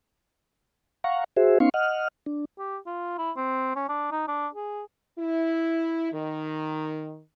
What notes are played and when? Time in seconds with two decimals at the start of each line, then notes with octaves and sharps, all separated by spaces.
1.04 F5 F#5 A#5 C#6
1.37 F#4 G#4 C5 E5
1.60 B3 C#4 D#4 F5 C6 C#6
1.74 D#5 F#5 F6
2.26 D4
2.59 G4
2.86 F4
3.18 E4
3.37 C4
3.76 C#4
3.89 D4
4.11 D#4
4.28 D4
4.54 G#4
5.18 E4
6.12 D#3